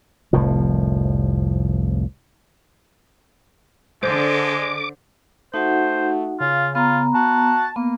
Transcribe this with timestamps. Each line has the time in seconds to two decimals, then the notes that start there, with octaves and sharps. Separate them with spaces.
0.33 F1 C2 A2 F3
4.03 D3 G#3 C5 D6
5.54 A3 D#4 F#4 C5 F#5
6.40 C#3 F4
6.75 B3 F4 A#5
7.14 F#4 A5
7.76 A#3 B3